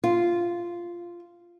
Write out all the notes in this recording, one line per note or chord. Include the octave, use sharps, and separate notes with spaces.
F4